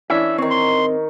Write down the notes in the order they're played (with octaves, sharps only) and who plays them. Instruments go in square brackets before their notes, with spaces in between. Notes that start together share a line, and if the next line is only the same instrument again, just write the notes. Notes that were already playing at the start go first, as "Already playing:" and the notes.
[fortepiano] E3 C#4 D4 [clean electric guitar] E5
[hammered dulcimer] D#3 C#6 [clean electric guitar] C4
[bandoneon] C6